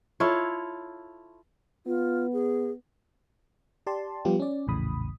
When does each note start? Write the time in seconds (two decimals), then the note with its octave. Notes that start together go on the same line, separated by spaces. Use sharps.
0.20 E4 F4 A4 C#5
1.86 B3 F4
2.33 G#4
3.87 G4 D5 A5 C6
4.25 F3 G3 B3 F4 G4
4.40 C#4 D5
4.67 A#1 E2 A2 C#3 B5 D#6